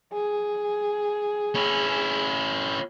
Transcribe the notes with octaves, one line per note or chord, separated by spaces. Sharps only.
G#4
C#4 E4